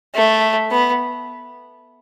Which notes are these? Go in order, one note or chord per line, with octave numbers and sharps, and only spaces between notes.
A3
B3